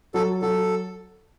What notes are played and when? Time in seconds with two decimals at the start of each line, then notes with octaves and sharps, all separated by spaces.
0.14 F#3 A4
0.42 F#3 A4